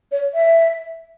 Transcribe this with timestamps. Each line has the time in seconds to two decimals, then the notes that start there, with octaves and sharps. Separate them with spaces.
0.12 C#5
0.34 E5